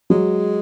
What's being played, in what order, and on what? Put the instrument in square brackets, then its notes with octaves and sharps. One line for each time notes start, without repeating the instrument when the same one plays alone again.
[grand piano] F#3 [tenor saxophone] G#3